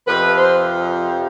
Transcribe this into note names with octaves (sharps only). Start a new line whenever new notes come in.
F2 C3 F3 B4
C5